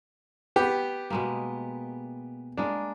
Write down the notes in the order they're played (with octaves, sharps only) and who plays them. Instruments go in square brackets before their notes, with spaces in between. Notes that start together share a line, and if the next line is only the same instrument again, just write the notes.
[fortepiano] B3 G4
[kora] B2 G#3 A#3
[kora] G#3 A#3 [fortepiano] D4